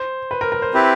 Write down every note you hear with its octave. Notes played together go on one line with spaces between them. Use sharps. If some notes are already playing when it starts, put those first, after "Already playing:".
Already playing: C5
B4
A#4
A#4
C5
C4 E4 G4 B4